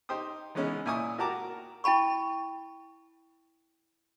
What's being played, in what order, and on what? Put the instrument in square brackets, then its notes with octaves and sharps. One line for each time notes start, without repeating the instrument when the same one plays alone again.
[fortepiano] D#4 G4 C5 G5 D#6
E3 G#3 B3 C#4 D#4
A#2 E4 G#5 C#6 D#6
F#4 G4 A#4 A5 A#5 D6
[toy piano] E4 G5 A5 B5 C#6